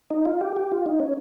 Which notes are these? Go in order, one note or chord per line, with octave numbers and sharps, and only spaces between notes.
D#4
F4
G4
G4
F4
D#4
C#4